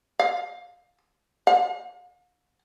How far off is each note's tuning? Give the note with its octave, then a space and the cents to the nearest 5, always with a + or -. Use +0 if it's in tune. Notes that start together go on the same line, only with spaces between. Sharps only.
F5 +25
F5 +45